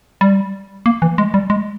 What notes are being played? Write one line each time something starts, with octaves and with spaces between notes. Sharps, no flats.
G3
A#3
E3
G#3
G3
G#3